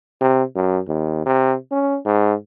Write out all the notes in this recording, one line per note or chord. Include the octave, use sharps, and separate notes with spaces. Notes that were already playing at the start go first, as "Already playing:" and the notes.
C3
F#2
D#2
C3
C#4
G#2